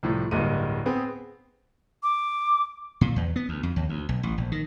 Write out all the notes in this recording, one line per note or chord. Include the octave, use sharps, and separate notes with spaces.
C2 A2 F3
D1 G1 G2 G#3 A#3 D#7
B3 C4 G#4 B4
D6
A#2
E2
B3
D2
F2
D#2
D2
B1
A1
A#1
D#3